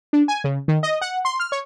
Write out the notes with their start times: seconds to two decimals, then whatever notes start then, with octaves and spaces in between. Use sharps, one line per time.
0.13 D4
0.28 G#5
0.44 C#3
0.68 D#3
0.83 D#5
1.01 F#5
1.25 C6
1.40 F6
1.52 C#5